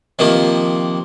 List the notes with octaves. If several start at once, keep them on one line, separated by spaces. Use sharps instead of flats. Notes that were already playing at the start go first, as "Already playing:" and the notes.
C3 D#3 F3 A#3